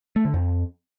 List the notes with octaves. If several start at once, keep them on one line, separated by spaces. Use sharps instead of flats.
A3
D3
F2